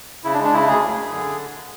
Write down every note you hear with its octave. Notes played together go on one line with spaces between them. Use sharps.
C#3 E4
D4
G#3
D4
C#3 E4
D2 G#4
F#2
F#2
D3